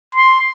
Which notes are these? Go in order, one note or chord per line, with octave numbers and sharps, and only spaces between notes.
C6